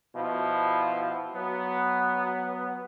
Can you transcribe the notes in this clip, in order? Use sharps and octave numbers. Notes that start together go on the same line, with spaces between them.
B2 F3 E4
F#3 B3